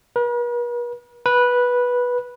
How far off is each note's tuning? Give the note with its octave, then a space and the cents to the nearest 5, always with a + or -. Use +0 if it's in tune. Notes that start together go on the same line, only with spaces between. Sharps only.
B4 -45
B4 -10